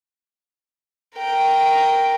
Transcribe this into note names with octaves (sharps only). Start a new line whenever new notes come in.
A#4 G5